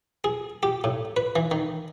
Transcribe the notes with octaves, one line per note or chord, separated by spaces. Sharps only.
G#4
G4
A2
B4
E3
D#3